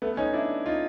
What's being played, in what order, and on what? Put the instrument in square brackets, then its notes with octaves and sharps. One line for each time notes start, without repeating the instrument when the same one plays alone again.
[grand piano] A3 B3
C#4 D#4
D4 E4
D#4 F4